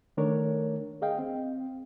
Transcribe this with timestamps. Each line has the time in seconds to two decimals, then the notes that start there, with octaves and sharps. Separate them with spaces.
0.17 D#3 A3 D4 A#4 C#5
1.02 G#4 D#5 F5 G5
1.19 C4